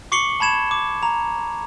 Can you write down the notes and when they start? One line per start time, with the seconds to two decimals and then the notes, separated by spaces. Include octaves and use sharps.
0.12 C#6 D6 C7 C#7 F#7 G7
0.40 A5 B5 G#6 E7
0.71 D6
1.03 A#5 F7